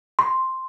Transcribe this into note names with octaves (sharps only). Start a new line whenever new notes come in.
C6